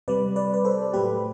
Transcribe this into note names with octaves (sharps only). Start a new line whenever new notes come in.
C3 G3 B4 D5
B4 D5
B4
A4 C5
A2 F#3 A3 G4 B4